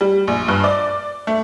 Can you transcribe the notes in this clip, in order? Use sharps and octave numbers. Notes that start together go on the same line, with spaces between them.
G3
A#1
G2
D5
A3